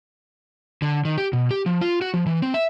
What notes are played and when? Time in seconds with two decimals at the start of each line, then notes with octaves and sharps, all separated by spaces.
0.82 D3
1.05 D#3
1.17 G4
1.33 B2
1.51 G4
1.66 F3
1.81 F4
2.01 F#4
2.14 F3
2.26 E3
2.42 C4
2.54 E5